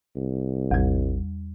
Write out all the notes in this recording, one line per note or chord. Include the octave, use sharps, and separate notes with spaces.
C2
A1 E2 G3